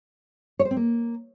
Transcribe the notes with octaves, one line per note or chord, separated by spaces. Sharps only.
C#5
C5
C4
A#3